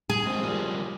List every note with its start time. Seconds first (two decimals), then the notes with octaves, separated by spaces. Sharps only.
0.10 G#4
0.26 G#3 C4
0.43 F3 G3 A#3